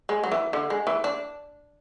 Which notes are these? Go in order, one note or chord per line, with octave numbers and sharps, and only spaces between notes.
G#3
F#3
E3
D3
G#3
E3
D4